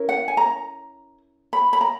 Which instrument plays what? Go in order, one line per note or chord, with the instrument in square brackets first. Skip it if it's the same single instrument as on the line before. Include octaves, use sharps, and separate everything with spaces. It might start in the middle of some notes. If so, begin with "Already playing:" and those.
Already playing: [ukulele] C#4 E4 A#4
F#5
G#5
A#5
B5
B5
A#5